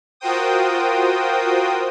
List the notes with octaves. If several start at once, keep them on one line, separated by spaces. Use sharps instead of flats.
F4 F#4 A#4 C5 G5 D#6